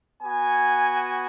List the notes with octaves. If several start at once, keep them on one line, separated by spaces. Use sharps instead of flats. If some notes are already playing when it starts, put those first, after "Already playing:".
B3 F#4 G#5